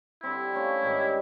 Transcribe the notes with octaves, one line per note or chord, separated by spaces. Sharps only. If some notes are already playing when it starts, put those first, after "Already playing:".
D3 G3 C4 E4
A3 C#4 F4
G#2 D#3 G3